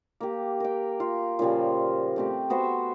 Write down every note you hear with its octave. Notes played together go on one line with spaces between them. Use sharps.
A#3 G4
A#4 G5
F4
A#2 C#3 F3 G3
A3 C4 G4
B3 F#4 C5 E5